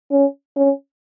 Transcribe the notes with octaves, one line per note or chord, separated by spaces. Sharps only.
C#4
C#4